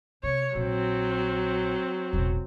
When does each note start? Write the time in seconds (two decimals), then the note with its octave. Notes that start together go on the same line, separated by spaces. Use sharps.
0.23 C3 C#5
0.55 A#1 F#3 C4
2.13 E1 A1